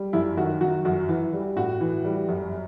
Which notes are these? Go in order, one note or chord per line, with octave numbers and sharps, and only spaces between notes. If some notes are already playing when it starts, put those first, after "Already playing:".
Already playing: G3
F#2 E4
D#3 F#4
F#3 F#4
F#2 F#4
E3
G3
A2 F#4
E3
G3
F#2